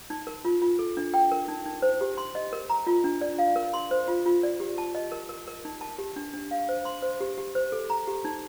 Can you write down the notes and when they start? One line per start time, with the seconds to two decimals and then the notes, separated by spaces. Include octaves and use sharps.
0.10 D#4
0.27 A#4
0.45 F4
0.62 F4
0.79 A4
0.97 D4
1.14 G5
1.31 A#4
1.48 D#4
1.66 D#4
1.82 C5
2.01 G4
2.17 C6
2.35 D#5
2.53 A#4
2.70 A#5
2.87 F4
3.04 D4
3.21 D5
3.39 F5
3.56 A#4
3.73 C6
3.91 C5
4.08 F4
4.26 F4
4.43 D5
4.60 G4
4.78 A5
4.95 D#5
5.12 A#4
5.29 A#4
5.47 A#4
5.65 D#4
5.81 A5
5.99 G4
6.16 D4
6.33 D4
6.51 F5
6.69 C5
6.85 C6
7.02 C5
7.21 G4
7.38 G4
7.55 C5
7.72 A4
7.90 A#5
8.08 G4
8.25 D#4